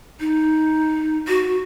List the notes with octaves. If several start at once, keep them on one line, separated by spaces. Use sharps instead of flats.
D#4
F#4